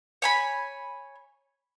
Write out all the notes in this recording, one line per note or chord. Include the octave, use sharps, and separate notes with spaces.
C#5 G#5 B5